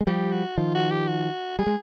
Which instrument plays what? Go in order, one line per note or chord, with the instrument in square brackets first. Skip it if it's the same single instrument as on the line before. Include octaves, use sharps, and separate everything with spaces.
[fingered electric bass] G#3
[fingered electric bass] F3 G3 [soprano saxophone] G4
[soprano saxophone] F#4
[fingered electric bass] D#3 F3 [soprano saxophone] F4
[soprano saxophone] F#4
G4
F#4
[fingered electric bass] G3 [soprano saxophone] G#4
[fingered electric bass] G#3